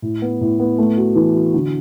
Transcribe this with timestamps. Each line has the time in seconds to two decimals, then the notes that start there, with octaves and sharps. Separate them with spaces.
0.02 A2
0.22 B3
0.41 A2
0.60 B3
0.78 A3
0.97 F#4
1.15 E3
1.34 F#4
1.54 D3